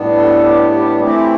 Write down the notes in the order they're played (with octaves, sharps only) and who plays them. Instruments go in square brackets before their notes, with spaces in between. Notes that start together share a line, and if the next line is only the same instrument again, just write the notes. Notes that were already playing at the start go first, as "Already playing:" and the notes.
Already playing: [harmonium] A2 G3 B3 D4
A4
G4
G4
E3 A3 C4 E4 G4